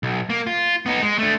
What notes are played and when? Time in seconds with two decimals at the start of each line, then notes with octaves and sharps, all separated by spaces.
0.03 B1
0.30 A#3
0.47 F4
0.86 B3 D#4
1.02 G#3
1.19 A3 D4